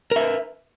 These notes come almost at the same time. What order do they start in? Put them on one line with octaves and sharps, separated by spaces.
A#4 E5 B4